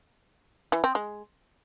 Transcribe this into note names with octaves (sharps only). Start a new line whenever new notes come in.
E3
C4
G#3